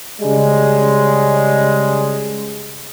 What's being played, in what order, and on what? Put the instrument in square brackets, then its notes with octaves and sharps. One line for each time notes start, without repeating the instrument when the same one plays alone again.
[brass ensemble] C#3 G3 G#3